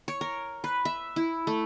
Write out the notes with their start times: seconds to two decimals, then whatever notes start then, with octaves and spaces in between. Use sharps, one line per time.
0.08 C#5
0.21 A#4
0.64 B4
0.85 E5
1.16 E4
1.47 A3